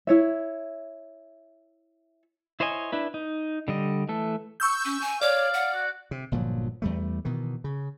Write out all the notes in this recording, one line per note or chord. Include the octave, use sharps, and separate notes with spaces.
E4 C#5 E5
E4 C5 C#5 D#5 G#5
D4 E4 B4
D#4
D3 G3 D#5
E3 A3 A4
C#6 E6 G6
C#4
G#5
C#5 D5 F5
F#5
F#4
C3
G1 A#2 F3 F#3
E2 G3 A3
B2 D#3 E3
C#3